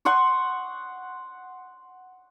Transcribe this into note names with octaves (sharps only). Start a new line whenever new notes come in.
F#5 C6 C#6 D#6